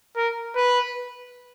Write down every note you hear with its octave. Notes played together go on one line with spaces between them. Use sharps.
A#4
B4